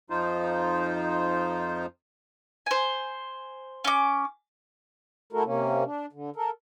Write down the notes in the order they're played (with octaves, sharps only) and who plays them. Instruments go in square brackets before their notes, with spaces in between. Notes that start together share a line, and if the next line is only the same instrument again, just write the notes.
[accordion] F2 F3 D#4 F4 C5
[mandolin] C5 G#5
C#4 D6
[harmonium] A3 E4 F#4 A4 A#4
C3 A#3 C#4
D4
D3
A4 A#4